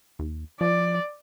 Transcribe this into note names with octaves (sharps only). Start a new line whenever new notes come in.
D#2
F3 D5